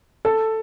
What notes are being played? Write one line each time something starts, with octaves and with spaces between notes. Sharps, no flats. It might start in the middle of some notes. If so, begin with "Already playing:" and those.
A4